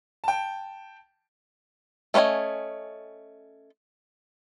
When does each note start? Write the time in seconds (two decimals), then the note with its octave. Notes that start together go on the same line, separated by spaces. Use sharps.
0.24 G5 A5
2.14 A3 C#4 B4 D#5 G#5